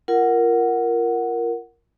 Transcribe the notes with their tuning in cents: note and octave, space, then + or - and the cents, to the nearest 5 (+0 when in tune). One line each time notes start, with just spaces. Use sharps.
F4 -25 A#4 +0 F#5 +0